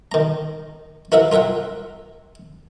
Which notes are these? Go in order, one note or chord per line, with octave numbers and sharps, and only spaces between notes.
D#3 A#5
E4 A#4 B4 E5 F#5
F4 A#4 E5 F#5 G5